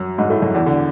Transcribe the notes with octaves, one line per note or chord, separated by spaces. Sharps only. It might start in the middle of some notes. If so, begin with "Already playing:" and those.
Already playing: F#2 F#3
G#2 G#3
A2 A3
F#2 F#3
E2 E3
D3